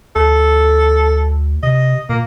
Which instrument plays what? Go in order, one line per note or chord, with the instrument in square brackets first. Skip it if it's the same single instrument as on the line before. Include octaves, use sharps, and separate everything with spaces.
[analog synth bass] D2 [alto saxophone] A4
[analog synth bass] C3 [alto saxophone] D#5
[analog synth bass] A#2 [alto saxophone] A#3